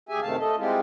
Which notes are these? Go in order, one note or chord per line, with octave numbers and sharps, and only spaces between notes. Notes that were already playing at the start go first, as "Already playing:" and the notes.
D2 G4 G#4 E5 G#5
F#2 C3 D#3 A3 F5 A5
A3 A4 D#5
G3 G#3 C4 E4 F4